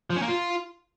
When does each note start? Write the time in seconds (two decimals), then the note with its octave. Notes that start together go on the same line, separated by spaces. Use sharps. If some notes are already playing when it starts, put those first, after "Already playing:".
0.10 F3
0.16 C#4
0.22 A#3
0.28 F4